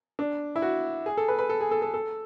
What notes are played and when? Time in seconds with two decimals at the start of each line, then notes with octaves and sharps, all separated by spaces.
0.19 D4
0.56 E4
0.62 F#4
1.06 G#4
1.17 A4
1.28 B4
1.39 B4
1.49 A4
1.61 G#4
1.71 A4
1.82 A4
1.94 A4